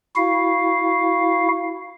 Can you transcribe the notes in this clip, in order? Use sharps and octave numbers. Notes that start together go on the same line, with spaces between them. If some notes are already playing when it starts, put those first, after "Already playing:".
E4 F#4 F5